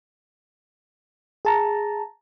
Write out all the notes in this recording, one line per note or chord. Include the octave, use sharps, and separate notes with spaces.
G#4 A5 A#5